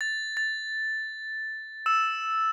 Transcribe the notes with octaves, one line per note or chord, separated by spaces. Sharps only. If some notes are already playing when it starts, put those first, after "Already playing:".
A6
A6
E6 E7